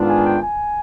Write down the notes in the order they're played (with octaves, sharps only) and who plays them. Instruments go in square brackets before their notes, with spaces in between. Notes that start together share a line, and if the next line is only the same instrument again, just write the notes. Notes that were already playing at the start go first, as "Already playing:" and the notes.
Already playing: [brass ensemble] G#2 D#3 B3 D4 F4
[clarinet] G#5
G5
G#5